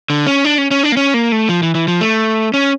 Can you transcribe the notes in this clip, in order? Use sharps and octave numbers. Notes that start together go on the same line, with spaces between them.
D3
C#4
D4
C#4
C#4
D4
A#3
C#4
A#3
A3
F3
E3
E3
F3
A3
C#4